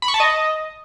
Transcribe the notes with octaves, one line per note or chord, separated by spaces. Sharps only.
B5
C#6
A5
D#5